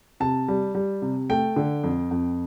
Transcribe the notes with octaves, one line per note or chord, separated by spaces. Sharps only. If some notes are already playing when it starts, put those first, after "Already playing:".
C3 A5
G3
G3
C3
A3 G5
D3
F2
F2